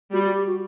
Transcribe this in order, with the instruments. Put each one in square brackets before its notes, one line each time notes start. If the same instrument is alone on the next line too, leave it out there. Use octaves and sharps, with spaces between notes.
[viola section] G3 [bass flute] F#4
[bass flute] F#4
G4
F#4